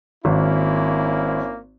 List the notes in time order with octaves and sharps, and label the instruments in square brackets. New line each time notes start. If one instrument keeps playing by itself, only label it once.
[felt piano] G#1 [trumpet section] A#3 C#4 E4